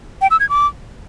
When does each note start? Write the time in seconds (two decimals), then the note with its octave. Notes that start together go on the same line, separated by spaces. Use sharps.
0.21 G5
0.31 E6
0.40 G#6
0.49 D6